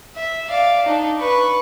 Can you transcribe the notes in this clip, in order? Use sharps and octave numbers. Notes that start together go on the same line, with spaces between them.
E5
D5 F5
D4 D#4
B4 C#6